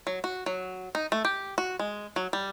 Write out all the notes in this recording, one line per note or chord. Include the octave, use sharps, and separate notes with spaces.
F#3
F#4
F#3
D#4
A3
G4
F#4
G#3
F#3
G3